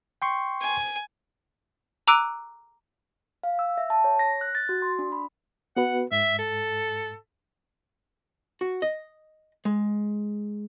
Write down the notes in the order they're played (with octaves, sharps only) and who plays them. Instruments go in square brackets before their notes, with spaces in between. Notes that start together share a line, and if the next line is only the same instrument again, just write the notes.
[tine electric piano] G5 C6 C#6
[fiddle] G#5
[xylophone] A#5 D6 E6 F#6 D7 D#7
[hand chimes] F5
E6
E5
A5
C#5
A#6
F#6
A6
F#4
C6
D4
B5
[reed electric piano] B3 F#4 B4 [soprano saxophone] F#5
[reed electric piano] G#2 [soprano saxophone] E5
[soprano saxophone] A4
[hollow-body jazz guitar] F#4
D#5
G#3